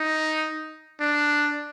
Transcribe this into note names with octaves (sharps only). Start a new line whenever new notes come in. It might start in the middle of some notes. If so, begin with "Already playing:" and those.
Already playing: D#4
D4